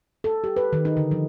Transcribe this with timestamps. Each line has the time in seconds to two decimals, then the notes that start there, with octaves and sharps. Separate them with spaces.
0.24 A4
0.44 G4
0.57 B4
0.73 D#3
0.85 D#4
0.97 D3
1.11 F3